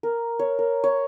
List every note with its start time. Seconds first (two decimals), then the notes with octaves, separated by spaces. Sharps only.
0.03 A#4
0.39 C#5
0.59 A#4
0.84 C#5